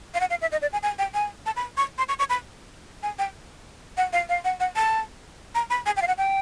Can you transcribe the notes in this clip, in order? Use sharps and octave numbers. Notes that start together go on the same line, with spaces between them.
F5
F#5
F5
E5
D#5
D5
G#5
G#5
G5
G#5
A5
B5
C#6
C6
C#6
C#6
B5
G#5
G5
F#5
F5
F5
F#5
F#5
A5
A#5
B5
G#5
G5
F5
F#5
G5